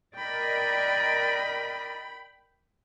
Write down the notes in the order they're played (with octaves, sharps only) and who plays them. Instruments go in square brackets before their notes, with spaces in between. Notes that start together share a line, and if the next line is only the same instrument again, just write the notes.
[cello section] A#4 D5 D#5 [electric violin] G5 B5